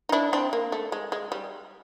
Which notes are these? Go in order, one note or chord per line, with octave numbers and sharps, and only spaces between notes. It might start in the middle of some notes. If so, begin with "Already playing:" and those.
D#4
D4 E4
C4 D4
A#3
A3
G#3
G#3
G3